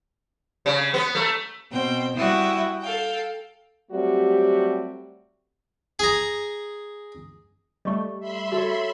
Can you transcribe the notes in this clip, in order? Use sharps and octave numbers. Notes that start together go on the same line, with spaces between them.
C#3
B3
A3
B2 C4 G5
G3 E4 F#4 G5 D#6
A4 F5 G5
F#3 G3 A3 C4 F#4 G4
G#4 A#5
G3 A3 D#5 C#6
E5 B5 C6
F#4 A4 C#5